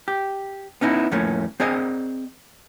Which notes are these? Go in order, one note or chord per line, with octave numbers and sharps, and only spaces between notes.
G4
B3 C#4 D#4 E4
F2 A2 A3 A#3 C#4
C4 G#4 D5 D#5